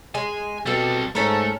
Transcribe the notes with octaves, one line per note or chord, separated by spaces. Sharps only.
G#3 G#5
B2 G3 C4 A4 F5
G#2 A3 C#4 A4 A#4